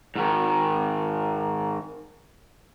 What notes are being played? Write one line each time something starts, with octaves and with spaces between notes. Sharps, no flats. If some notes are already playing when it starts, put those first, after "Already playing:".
G#2 D#3